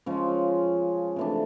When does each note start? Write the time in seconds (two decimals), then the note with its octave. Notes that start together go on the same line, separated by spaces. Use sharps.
0.06 C#3 F3 G#3 C#4
1.16 C3 E3 A3 D4